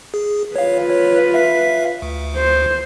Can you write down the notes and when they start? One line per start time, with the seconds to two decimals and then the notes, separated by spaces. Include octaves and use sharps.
0.14 G#4
0.56 F4 B4 C#5 F5
0.90 C#5
1.34 E5 F5 B6
2.02 D2
2.36 C5